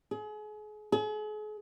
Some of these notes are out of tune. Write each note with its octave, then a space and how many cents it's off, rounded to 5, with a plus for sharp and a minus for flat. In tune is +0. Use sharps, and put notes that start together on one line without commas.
G#4 +35
G#4 +40